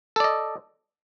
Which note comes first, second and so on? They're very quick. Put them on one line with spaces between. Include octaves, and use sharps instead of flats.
A4 D5 D#5